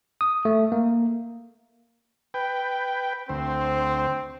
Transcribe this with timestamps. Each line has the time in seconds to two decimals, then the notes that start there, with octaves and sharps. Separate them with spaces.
0.21 D#6
0.45 A3
0.72 A#3
2.34 B4 G5
3.29 D2 C4 C5